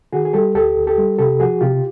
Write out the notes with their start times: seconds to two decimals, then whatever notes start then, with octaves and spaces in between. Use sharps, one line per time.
0.13 D#3 F#4 G#4
0.25 G#4
0.33 G3 G4 A4
0.55 D2 G4 A4
0.76 D2
0.87 G4 A4
0.98 G3
1.19 C3 G4 A4
1.40 F3 F#4 G#4
1.61 C3 F4 G4